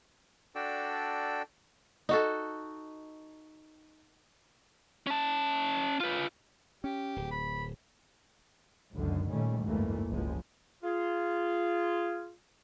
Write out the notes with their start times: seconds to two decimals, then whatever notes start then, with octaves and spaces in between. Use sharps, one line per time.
0.55 D4 F#4 A4 D5 G5 E6
2.09 D#4 F#4 A4
5.07 C#4 A5
6.00 F4 B4
6.84 C#4 G4
7.16 D1
7.31 B5
8.95 F#1 C#2 F#2 D3 D#3
9.31 A#2 D#3 G3 A3 C#4
9.63 F#1 D2 G#2 E3 A3 A#3
10.09 F#1 C#2 F3 G#3
10.84 F4 G#4